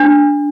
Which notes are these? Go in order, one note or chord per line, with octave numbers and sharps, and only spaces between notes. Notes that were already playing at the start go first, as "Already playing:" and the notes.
Already playing: D4